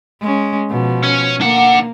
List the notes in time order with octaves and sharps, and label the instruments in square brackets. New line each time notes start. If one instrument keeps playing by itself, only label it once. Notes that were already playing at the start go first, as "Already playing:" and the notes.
[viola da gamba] G#3 C#4
B2 F3
[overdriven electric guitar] C#4
[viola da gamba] A#3 [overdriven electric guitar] D4 F#5